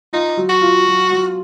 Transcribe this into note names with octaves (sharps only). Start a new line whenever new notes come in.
D#4 F4
F#3
F#4
F4
F#3
F#3